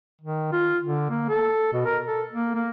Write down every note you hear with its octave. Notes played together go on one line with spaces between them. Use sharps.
D#3
F4
D3
A#3
A4
B2
A#4
A4
A#3
A#3